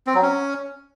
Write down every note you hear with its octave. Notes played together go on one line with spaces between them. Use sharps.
C4
F#3
C#4